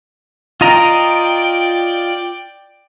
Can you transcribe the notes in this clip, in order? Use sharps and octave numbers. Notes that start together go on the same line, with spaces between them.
F4 D5 D#5 G5 A#5